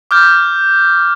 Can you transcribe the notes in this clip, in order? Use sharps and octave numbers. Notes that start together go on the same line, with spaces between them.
D6 F6 G6